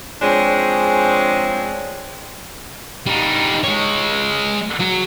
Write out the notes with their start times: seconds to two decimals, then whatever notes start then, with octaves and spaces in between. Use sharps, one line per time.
0.22 F3 G#3 C4 D4 G#4 C#5
3.06 G3 D#4
3.64 G#3 C#5
4.80 F#3